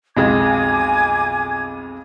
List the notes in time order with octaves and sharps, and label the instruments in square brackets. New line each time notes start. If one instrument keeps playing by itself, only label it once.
[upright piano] B1 F2 G#3 [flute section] G#5 D6 G#6